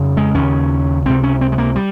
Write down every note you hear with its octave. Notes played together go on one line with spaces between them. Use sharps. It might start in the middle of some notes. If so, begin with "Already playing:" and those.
Already playing: F2 C#3
G#3
D#2 C#3 C#4
C#2 C3 C4
C#4
C4
G#3
A#3
G3